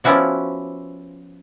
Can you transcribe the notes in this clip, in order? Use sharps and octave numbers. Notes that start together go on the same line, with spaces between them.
F3 B3 C#4 E4 F#4 D5